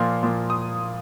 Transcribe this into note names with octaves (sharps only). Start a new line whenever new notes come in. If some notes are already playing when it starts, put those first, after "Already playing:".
Already playing: A#2 F3 A#3 C6
A#2 F3 A#3
D#6